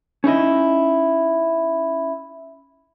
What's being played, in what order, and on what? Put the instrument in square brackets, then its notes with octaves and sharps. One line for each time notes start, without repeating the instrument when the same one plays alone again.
[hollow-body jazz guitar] C#4 D#4 E4 D#5